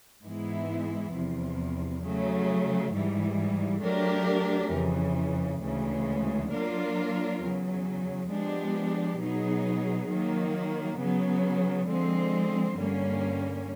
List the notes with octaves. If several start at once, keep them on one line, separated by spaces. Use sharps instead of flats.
G#2 E3 G#3 B3 E4
E2 C3 F3
C#3 F#3 A3
G#2 E3 G3
F#3 A3 D4 G4 A#4
F2 C#3 E3
D2 C#3 E3 G#3
F#3 A#3 D4 F4 A#4
E2 C#3 F#3
F3 G#3 B3 D4 G4
B2 F#3 B3 D#4 G#4
D#3 F#3 A#3
C#3 F#3 B3
D3 F3 G#3 C4
G2 D3 G3 A#3 C#4